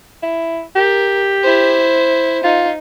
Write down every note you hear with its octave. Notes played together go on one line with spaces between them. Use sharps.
E4
G4 A#4
E4 C5
D#4 F4